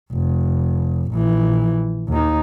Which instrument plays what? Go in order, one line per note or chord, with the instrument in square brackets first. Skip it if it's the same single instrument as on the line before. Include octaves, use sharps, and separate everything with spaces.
[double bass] F1
A#1 E3
D#2 D#4